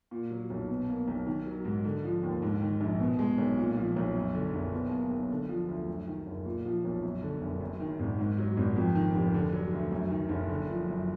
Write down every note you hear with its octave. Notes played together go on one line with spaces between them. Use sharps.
A#2
F#3
B1
B2
A#3
B1
D#3
F#3
G#2
D3
F3
D#2
G#2
D#3
A#1
B2
G#3
B1
A#2
F3
B1
F#2
D3
F#1
B2
A#3
B1
D3
F3
D2
F#2
D#3
F#1
A#2
F3
B1
F#2
D3
F#1
F#2
D#3
G#1
G#2
F#3
G#1
F2
D#3
F1
D3
F#3
D2
F#2
D#3
F#1
D3
F3
F#2